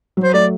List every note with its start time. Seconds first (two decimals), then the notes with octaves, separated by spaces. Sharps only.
0.17 F#3
0.23 C5
0.34 A3 D5